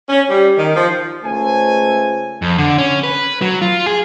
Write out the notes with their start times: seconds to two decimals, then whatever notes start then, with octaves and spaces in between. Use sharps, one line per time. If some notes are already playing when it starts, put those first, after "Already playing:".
0.08 C#4
0.30 G3
0.57 D#3
0.76 F3
1.24 C#2 A3 C5 G#5
2.42 F2
2.58 D3
2.78 C#4
3.04 B4
3.42 F#3
3.62 F4
3.86 G#4